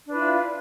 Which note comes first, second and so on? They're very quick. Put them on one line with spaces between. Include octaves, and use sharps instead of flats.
D4 B4 E4 F4